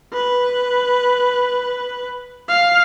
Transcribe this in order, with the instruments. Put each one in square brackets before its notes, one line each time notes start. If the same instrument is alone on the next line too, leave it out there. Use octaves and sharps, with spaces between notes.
[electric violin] B4
F5